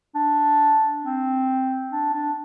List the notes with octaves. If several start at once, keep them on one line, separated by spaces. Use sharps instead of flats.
D4
C4
D4
D4